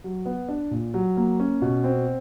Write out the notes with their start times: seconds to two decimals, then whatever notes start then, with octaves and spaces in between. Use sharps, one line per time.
0.04 F#3
0.26 B3
0.49 D4
0.71 A#2
0.94 F#3
1.17 A#3
1.40 C#4
1.62 B2
1.84 C4